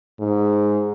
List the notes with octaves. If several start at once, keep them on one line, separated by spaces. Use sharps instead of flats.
G#2